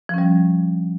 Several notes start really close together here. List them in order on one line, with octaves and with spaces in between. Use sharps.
F3 C#4 G3